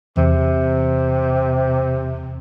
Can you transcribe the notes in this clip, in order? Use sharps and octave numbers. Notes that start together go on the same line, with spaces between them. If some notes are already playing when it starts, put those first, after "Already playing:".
E2 C3